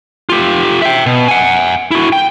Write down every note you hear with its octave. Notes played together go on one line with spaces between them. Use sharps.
F4 G4
E5 G5
B2
F#5 G#5
E4 F#4
G5